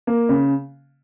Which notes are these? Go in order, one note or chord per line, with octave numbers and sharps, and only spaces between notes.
A#3
C#3